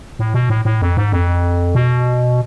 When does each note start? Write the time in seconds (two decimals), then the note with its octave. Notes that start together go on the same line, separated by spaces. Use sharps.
0.19 A2
0.34 B2
0.50 A2
0.65 A2
0.82 F2
0.97 G#2
1.12 F2
1.75 B2